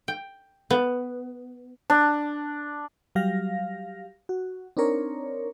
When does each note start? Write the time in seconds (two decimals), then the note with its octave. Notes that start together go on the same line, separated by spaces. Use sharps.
0.08 G5
0.70 B3
1.90 D4
3.15 F#3 G3 G4 F5 A#6
4.29 F#4
4.77 C4 D4 D#4 A#4 C#5